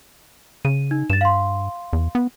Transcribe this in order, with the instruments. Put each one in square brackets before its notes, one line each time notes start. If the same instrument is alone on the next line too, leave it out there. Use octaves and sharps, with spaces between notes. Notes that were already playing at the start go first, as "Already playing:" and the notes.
[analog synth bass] C#3 [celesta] D#7
[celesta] D#4
[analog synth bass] G2 [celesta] A6 E7
[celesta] F5 C6
[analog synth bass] E2
B3